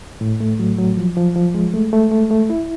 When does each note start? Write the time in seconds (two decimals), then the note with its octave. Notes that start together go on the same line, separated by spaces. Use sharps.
0.21 A2
0.40 A3
0.59 F#3
0.78 F#3
0.97 F3
1.17 F3
1.36 F3
1.55 G#3
1.74 A3
1.93 A3
2.11 A3
2.31 A3
2.50 E4